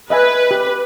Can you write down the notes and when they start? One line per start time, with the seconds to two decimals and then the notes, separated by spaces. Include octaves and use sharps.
0.10 B4 D#5 E5 G#5
0.51 G4